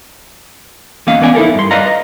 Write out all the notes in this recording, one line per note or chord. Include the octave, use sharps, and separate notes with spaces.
E2 A#3 C#4 D#5 F5
B3 C#4 D5 G#5
D#4 E4 A4 A#4
G2 C6
B4 D5 D#5 F5 A#5
D#5